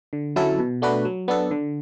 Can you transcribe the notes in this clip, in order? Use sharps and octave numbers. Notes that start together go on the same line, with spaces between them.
D3
F#3 C#4 E4 A4
B2
A3 D4 F#4 B4
F#3
B3 D4 A4
D3